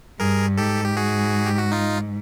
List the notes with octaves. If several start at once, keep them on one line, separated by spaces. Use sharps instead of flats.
G2 G#4 A#4
G#2 G4 A4
G4
F#4 G#4
G4
F#4
D#4 F4